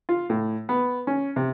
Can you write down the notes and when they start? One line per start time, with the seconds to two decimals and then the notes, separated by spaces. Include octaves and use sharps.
0.09 F4
0.30 A2
0.69 B3
1.07 C#4
1.36 C3